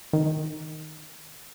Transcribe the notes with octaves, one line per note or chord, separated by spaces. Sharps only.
D#3